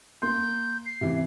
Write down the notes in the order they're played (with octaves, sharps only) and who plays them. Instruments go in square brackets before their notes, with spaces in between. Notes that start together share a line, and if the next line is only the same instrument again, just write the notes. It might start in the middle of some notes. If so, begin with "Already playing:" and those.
[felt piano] A#3 C6 [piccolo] G6
[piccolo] C7
[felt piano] C3 E3